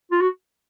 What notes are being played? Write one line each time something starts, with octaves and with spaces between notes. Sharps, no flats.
F4
F#4